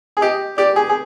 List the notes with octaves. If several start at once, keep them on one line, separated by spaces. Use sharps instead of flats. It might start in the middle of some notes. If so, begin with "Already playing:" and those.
G#4
G4 D#5
G4 D5
G#4
G#4